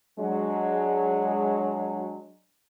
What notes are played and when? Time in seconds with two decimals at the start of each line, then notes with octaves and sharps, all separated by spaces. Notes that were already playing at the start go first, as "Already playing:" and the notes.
0.18 F#3 G#3 D4